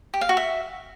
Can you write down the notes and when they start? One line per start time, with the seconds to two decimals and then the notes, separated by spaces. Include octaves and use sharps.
0.14 G4
0.21 F5
0.29 F#4
0.37 E5